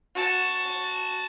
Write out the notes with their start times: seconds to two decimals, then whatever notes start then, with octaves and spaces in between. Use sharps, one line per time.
0.16 F#4 A5